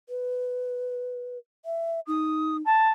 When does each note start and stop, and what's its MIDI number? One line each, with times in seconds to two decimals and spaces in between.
0.09 1.38 71
1.65 2.00 76
2.07 2.62 63
2.07 2.57 87
2.65 2.90 81